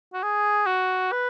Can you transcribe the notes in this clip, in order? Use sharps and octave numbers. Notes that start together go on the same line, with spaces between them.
F#4
G#4
F#4
B4